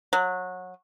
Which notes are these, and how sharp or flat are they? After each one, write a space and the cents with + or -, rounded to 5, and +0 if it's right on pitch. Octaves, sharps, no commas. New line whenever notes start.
F#3 -20